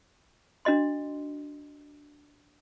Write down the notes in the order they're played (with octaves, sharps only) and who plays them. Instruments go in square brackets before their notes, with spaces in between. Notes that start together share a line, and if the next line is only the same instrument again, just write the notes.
[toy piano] D4 F#4 D#5 C6